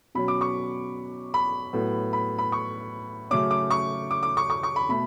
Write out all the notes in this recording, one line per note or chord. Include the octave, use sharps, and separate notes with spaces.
B2 F#3 C#4 B5
D6
C#6
B5
A2 F#3 B3
B5
B5
C#6
C#3 F#3 A3 C#4 D6
D6
C#6
D6
D6
C#6
C#6
C#6
B5
B2 A3 B5